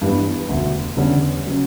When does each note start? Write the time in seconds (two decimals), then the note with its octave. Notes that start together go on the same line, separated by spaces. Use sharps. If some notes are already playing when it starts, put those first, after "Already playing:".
0.01 G2 E3 G3 B3
0.49 E1 D2 D3
0.96 E2 D3 G3 C#4 G4
1.46 C#3 F#3 C#4